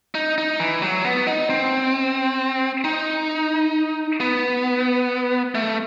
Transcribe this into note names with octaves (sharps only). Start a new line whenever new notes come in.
D#4
D#4
E3
F#3
B3
D#4
C4
D#4
B3
A3